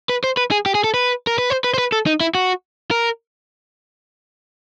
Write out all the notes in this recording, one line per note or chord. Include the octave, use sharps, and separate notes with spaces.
B4
C5
B4
G#4
G4
G#4
A4
B4
A#4
B4
C5
B4
C5
B4
A4
D#4
E4
F#4
A#4